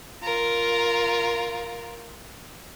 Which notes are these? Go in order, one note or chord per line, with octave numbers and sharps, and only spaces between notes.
F4 A#4